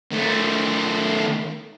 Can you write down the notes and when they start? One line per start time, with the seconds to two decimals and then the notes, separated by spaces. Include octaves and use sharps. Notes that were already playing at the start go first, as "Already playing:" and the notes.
0.12 D#3 A3